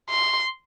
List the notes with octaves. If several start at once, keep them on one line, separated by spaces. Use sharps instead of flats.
C6